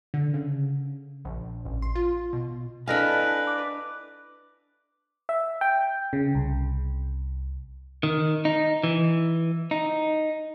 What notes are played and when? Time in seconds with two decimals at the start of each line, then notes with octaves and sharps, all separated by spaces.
0.14 D3
0.34 C#3
1.25 A#1
1.65 A1
1.82 C6
1.95 F4
2.33 B2
2.87 D4 E4 A4 B4 D#5 F5 G#5
3.47 D6
5.29 E5
5.61 G5
6.13 C#3
6.35 C2
8.03 D#3
8.45 D#4
8.84 E3
9.71 D#4